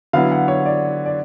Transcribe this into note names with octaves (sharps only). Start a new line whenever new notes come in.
D3 F#3 B3 E4 F5
F#5
C#5
D5
D5